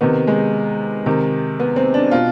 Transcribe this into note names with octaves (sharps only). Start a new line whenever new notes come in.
C3 D#3 B3
G#3
C3 D#3
B3
C4
D4
B2 F4